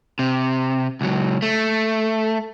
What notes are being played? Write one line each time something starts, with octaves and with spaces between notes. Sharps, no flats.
C3
C#2 F#3
A3